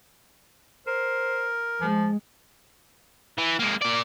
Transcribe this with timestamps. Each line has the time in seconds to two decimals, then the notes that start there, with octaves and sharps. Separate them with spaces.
0.87 A#4 C5
1.81 F3 G#3
3.38 E3
3.59 G#3 A#3
3.81 A#3 D5